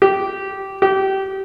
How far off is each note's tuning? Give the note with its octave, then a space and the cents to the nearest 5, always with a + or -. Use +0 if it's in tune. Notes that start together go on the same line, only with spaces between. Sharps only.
G4 -15
G4 -25